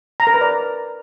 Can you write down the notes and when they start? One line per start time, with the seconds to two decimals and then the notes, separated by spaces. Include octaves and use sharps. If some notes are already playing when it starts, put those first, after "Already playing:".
0.20 A#5
0.27 A#4
0.34 B4
0.41 D5